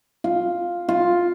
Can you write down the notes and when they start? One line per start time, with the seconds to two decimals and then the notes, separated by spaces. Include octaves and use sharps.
0.24 F4
0.89 F4